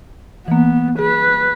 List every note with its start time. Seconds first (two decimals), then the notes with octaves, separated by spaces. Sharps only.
0.48 E3 A#3 B3
0.99 G#4 B4